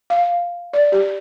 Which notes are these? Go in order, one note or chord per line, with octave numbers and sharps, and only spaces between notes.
F5
D5
G4